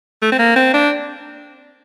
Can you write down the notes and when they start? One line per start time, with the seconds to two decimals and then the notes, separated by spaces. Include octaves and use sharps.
0.22 A3
0.32 C4
0.39 A#3
0.56 C4
0.74 D4